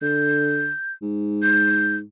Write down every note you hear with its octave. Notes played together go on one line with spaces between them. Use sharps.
D3 G6
G#2
G6